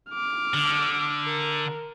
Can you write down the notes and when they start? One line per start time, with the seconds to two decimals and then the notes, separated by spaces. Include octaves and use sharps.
0.11 D6 F6
0.54 D3
1.25 A#4